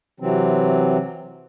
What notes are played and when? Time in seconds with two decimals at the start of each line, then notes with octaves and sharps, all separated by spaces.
0.20 C3 E3 F#3 C4